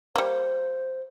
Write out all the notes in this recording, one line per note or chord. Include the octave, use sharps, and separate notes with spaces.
G3 A#3 C5